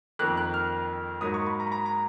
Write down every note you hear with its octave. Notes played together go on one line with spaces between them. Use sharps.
F2 D#3 A#3 F#6
F#6
F6
G#2 F#3 A#3 D#6
C#6
B5
A#5
B5
A#5
A#5